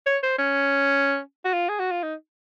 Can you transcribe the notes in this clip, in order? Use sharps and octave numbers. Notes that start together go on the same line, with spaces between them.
C#5
C5
C#4
F#4
F4
G#4
F#4
F4
D#4